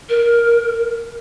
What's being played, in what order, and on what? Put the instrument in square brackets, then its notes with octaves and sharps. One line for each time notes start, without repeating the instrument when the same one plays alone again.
[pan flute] A#4